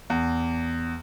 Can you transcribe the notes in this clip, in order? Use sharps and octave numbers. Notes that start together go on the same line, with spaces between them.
E2